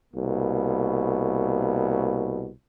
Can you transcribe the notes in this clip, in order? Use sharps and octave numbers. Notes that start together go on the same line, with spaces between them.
C2 B2 A#3